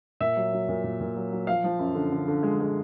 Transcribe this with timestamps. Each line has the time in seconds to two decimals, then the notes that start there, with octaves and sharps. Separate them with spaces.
0.20 A#2 E5
0.36 F#3
0.53 F#3
0.68 A#2
0.84 A#2
1.00 A#2
1.16 F#3
1.32 F#3
1.47 F3 F5
1.64 F3
1.79 F#2
1.95 D3
2.12 D3
2.28 D3
2.43 G#3
2.60 G#3